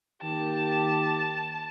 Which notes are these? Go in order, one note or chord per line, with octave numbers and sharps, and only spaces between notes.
D#3 A#3 G4 A5